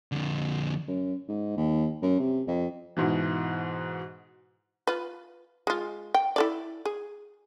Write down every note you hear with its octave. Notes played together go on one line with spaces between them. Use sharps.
F2 D3
F#2
G#2
D#2
F#2
C3
F2
G#2 B2 E3
F4 B4
G#3 F4
G5
E4 A4 D5
G#4